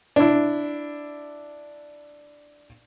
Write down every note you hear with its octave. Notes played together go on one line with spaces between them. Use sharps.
D4 E4